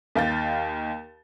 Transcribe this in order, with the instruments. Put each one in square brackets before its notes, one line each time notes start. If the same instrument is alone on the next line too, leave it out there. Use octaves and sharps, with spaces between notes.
[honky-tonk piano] D#2 F5 G5 A6